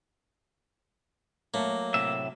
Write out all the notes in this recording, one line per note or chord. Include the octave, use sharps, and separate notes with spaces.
F#3 A3 A#3
A2 C3 E5